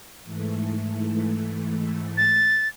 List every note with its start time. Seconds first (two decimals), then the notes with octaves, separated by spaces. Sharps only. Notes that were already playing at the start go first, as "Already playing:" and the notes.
0.24 G#2 E3 A3
2.17 A6